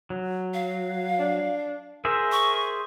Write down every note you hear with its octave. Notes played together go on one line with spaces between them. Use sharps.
F#3
F5
D4
G#4 A#4 C5 E5
C#6